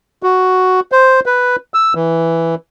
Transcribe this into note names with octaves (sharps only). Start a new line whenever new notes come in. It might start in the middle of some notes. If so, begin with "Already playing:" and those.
F#4
C5
B4
E6
E3